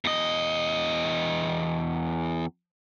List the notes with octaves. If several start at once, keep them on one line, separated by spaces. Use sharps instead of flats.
E2 D#5